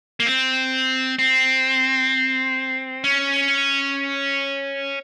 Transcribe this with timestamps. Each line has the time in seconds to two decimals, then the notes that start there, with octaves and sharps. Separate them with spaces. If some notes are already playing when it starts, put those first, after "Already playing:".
0.20 A#3
0.26 C4
1.19 C4
3.04 C#4